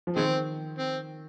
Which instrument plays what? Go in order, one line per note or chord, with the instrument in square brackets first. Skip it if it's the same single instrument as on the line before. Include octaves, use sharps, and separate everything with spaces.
[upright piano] F3
[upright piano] D#3 [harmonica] G#3 C4
[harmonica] C4